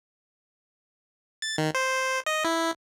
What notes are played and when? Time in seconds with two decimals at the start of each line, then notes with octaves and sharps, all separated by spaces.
1.42 A6
1.58 D#3
1.75 C5
2.26 D#5
2.45 E4